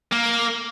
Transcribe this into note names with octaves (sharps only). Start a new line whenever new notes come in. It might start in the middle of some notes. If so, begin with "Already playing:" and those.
A#3